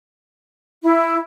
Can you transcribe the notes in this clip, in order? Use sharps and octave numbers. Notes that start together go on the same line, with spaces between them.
E4